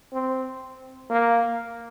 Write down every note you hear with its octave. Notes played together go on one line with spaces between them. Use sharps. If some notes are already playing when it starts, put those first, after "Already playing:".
C4
A#3